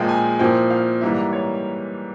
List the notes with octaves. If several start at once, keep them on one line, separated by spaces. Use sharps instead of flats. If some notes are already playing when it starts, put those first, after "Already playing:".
Already playing: A#2 F3 G#3 F5 G5
G#5
A#2 F3 C4 E4 G5
F5
G#2 E3 G3 A#3 E5
C#5